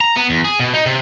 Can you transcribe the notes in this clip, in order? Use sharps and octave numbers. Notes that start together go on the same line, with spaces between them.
A#5
B3
E2
G#4
B2
D#4
C3